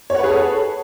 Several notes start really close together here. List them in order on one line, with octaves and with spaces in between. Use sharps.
C#5 F#5 B4 G#4 A4